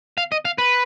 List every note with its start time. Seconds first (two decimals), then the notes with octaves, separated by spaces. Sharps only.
0.18 F5
0.32 D#5
0.45 F5
0.58 B4